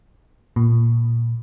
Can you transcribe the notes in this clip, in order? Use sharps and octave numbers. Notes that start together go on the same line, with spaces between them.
A#2